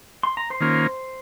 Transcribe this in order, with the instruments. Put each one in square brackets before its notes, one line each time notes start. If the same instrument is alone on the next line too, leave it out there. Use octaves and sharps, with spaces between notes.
[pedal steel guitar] C6
A#5
C5 C6
[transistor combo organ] D#3 A#3 C#4 F4